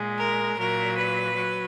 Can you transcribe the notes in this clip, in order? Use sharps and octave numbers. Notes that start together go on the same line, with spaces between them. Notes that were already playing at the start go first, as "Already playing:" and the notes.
Already playing: A#2 G#3
A#4
A#2 F#3 A#4
B4
F#3